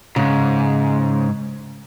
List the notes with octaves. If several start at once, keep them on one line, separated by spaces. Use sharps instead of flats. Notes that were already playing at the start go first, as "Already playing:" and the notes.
G#2 C#3